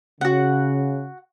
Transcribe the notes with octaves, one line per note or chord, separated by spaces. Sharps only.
C#3 F#4 F#5